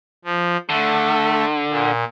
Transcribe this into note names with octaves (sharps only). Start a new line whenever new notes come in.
F3
D3 A3
A#2